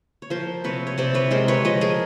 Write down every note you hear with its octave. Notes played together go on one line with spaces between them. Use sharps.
C#5
F3 A#4 C5
C3 B4 C#5
C#5
C3 C5 D5
B4 C#5
G#3 A#4 C5
B4 C#5
F3 C#5 D#5
G#4 A#4